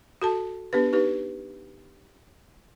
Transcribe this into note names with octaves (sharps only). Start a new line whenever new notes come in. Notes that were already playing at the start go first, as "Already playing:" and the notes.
F#4 A4 A5
B3 D4 G4 B4
D#4 G4 B4